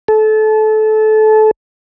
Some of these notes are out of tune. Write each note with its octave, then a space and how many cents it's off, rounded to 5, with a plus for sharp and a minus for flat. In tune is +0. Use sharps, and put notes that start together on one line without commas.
A4 -25